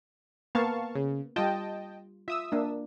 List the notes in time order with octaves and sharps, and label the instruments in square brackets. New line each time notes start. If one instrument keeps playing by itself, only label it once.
[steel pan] A#3 B3 [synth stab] F5 A5 C#6
[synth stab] C#3
[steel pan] G3 F4 [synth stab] D#5 G5 A5
[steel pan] F4 [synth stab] E5 D#6 E6
[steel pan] A#3 D4